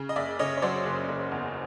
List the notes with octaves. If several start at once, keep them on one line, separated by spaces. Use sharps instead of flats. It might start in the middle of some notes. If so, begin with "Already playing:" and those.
Already playing: C#3
D#5
F#1 D5 E5
C#3 C#5 D#5
C#5
F#3 C5 D5
F#1
F#1
E2